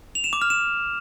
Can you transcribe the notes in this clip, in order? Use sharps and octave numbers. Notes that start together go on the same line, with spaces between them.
F7
E7
D6
F6
E7